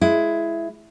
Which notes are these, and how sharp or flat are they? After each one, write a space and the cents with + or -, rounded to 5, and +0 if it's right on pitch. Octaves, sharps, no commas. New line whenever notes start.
G#3 +15 E4 +15